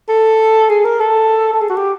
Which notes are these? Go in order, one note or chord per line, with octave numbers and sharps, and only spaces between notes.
A4
G#4
A#4
A4
A4
G#4
F#4
G4